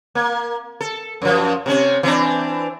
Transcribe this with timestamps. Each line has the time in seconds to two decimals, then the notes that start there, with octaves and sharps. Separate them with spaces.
0.15 A#3
0.81 A4
1.22 F#2 F3
1.66 C3 C4 C#4
2.03 E3 C4 D4